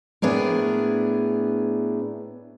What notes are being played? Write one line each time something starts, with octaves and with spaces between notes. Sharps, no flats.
A2 B3 D4 G#4 A#4